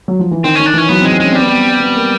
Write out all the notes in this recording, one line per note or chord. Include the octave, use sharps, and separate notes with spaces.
F#3
F3
E3
D#3 C4
D#3 C#4
D4
E3 C#4
F#3 B3
C4
G#3
C4
G#3 C#4
C4
G3 B3
C4
B3
A#3